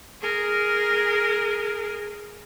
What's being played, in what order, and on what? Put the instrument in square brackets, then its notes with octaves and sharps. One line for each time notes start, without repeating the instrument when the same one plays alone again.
[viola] G#4 A#4